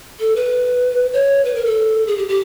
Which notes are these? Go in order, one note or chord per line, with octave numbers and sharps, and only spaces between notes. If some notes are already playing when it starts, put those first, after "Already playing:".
A4
B4
C#5
B4
A#4
A4
G#4
G4
G4